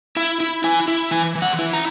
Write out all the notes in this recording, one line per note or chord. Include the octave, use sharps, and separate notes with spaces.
E4 E5
E4
E4 G#5
E4
E3 G#5
E3
F#5
E4
A#5